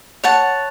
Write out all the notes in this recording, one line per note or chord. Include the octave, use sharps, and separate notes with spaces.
C#5 F#5 A5